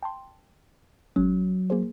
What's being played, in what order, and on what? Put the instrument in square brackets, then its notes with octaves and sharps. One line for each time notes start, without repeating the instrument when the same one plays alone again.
[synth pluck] G5 A5 C6
[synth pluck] G#1 G#3 C#4 [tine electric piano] F#3
[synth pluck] A#3 G#4 C5